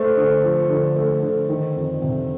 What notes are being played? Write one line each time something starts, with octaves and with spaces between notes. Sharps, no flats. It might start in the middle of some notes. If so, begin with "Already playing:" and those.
Already playing: A3 C5
D3
F3
D3
A3
D3
D#3
F2
C3